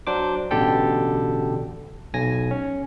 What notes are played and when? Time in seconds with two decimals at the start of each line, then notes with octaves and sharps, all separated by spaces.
0.07 F#3 D4 C5 D6
0.51 A1 B2 D3 G4 A4 G5
2.14 B1 G#5 A#6
2.51 C#4